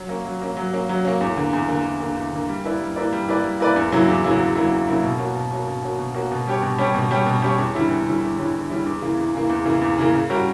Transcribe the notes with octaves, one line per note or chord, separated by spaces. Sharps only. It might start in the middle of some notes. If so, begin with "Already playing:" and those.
Already playing: F#3
A#3 C#4
F#3
A#3 C#4
F#3
A#3 C#4
F#3
A#3 C#4
E2
D3 A#3
E2
D3 A#3
E2
D3 A#3
E2
D3 A#3
G3
A#3 E4 B4 D5
G3
A#3 E4 B4 D5
G3
A#3 E4 B4 D5
G3
A#3 E4 B4 D5
E2
C#3 F#3 A#3 E4
E2
C#3 F#3 A#3 E4
E2
C#3 F#3 A#3 E4
E2
C#3 F#3 A#3 E4
B2
A#3 C#4 F#4
B2
A#3 C#4 F#4
B2
A#3 C#4 F#4
B2
A#3 C#4 F#4
B2
G3 C#4 G4 C#5
B2
G3 C#4 G4 C#5
B2
G3 C#4 G4 C#5
B2
G3 C#4 G4 C#5
E2
D3 G3 C#4 E4
E2
D3 G3 C#4 E4
E2
D3 G3 C#4 E4
E2
D3 G3 C#4 E4
E2
C#3 E3 A#3
E2
C#3 E3 A#3
E2
C#3 E3 A#3
E2
C#3 E3 A#3
C#3
G3 C#4 F#4 A#4